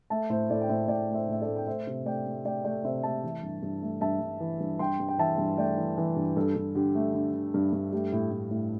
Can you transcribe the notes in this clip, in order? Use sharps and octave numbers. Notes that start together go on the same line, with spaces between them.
A3 E5 A5
A2 C5 E5
A2 A4 D5
G5
A2 C5 E5
A2 D5 G5
A3
C5 E5
A2 E5
A4 D5
A3
G5
A3 C5 E5
C3
A3 D5 G5
A3
A3 D5 G5
A3 D5 G5
C3 C5 E5
A3 E5 A5
E3
G2
G2
A3
G2 E5 A5
G2
E3
G2
G2 G5 C6
G2
G5
E3 E5 A5
G2
A3 D5 G5
E3
E3
G2
G2 A4
G2
D3 G4
A3
D3
D3
G2
G2
A3 G4
A2
A2
A2